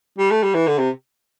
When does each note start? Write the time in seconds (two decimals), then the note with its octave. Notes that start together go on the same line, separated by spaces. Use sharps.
0.18 G3
0.31 A3
0.43 G3
0.54 E3
0.67 D3
0.79 C3